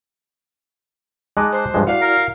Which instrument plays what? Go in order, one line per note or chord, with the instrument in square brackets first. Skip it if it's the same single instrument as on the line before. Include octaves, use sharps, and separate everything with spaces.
[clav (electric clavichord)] G#3 D#4 D#5 [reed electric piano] A5 D6 F#6
[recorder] C5
[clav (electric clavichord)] G2 F3 G#3
[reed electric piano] E4 F#4 D5 [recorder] F5 [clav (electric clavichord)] F#5
[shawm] A#4